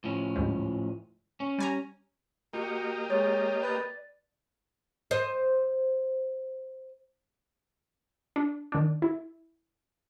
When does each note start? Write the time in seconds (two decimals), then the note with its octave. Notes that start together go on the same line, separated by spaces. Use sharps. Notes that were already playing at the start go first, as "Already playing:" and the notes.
0.04 A2 F3 C#4
0.36 D2 G#2 G3
1.40 C#4
1.58 G3 G#5 A#5
2.54 A#3 F#4 G4 D#5
3.10 G#3 C#5 A6
3.62 B4 D5 A6
5.11 C5 D#5
8.36 D4
8.72 D#3 D4
9.02 E4